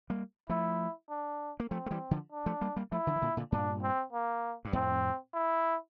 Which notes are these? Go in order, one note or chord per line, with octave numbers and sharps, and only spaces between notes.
G3 A#3
F3 A3 E4
D4
A#3
F3 A3 C4
A3
E3 G3
D3 F3
D4
F3 A3
G3 A#3
G3 A#3
F3 A3 E4
D3 F3
E3
A#2 D3
A#2 D3
G2 A#2 D4
C4
A#3
G2
F2 A2 C4
E4